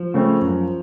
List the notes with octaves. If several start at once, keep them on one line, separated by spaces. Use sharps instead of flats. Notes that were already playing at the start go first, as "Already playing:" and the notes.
Already playing: F3
C#3 A3 C4
F#2